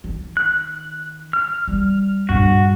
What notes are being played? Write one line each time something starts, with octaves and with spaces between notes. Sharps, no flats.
D#3
F#6
F6
G3
A#1 G2 F#4